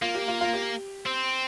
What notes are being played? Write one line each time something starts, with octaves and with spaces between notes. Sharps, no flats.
A#3 F4
G4
F4
F4
G4
C4